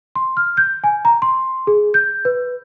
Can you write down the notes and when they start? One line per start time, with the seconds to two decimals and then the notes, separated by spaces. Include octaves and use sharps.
0.15 C6
0.37 F6
0.57 G6
0.84 G#5
1.05 A#5
1.22 C6
1.67 G#4
1.94 G6
2.25 B4